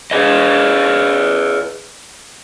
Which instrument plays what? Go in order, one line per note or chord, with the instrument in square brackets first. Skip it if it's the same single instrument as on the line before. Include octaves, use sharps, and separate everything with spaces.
[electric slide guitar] G#4 B4 D#5